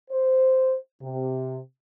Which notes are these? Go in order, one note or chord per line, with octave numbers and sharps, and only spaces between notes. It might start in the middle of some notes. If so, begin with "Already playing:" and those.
C5
C3